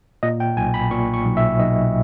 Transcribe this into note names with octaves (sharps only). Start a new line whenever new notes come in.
A#2 D#5
G5
B1 G#5
B5
A#2 C#6
C#6
B1
E5
B1 D#5